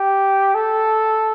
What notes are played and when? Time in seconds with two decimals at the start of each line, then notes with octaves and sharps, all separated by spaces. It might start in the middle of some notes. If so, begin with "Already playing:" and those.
Already playing: G4
0.54 A4